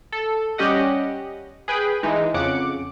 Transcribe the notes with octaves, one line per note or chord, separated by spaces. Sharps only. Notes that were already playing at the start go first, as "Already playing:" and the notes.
A4
G3 C#4 G4 D#5 F#5
G#4 B4 G5 B5
E3 G#3 D#4
F2 C#3 F#5 D6 C#7